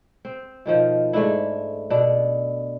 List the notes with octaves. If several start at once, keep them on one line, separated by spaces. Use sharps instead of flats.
C4
B2 D#3 F3
G#2 A3 D4 E4
B2 D4 A4